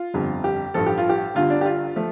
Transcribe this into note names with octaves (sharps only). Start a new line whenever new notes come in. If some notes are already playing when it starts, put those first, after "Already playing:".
Already playing: F4
G1 F2 D3 G3
G4
A1 G2 F3 A4
G4
F4
G4
G1 G2 D3 F4
D4
G4
F4
F3 A3